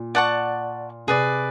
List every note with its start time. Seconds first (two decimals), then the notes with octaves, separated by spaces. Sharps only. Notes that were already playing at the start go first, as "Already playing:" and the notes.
Already playing: A#2
0.15 D5 F#5 A5 C#6
1.07 C3 G#4 B4 D5